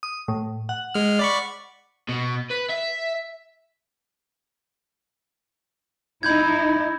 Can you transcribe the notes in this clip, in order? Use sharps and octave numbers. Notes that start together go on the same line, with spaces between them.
D#6
A2
F#5
G#3 F6
D5 B5 C#6
B2
B4
E5
D#4 E4 B5 G6 G#6